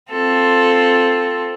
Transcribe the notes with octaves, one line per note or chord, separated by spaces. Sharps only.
C4 F4 A4